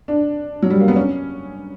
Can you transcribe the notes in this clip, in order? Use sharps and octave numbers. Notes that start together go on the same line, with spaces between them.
D4
F#3
G3
A#3
B3
C#4